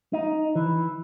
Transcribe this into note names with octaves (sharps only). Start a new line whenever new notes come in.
D#4
E3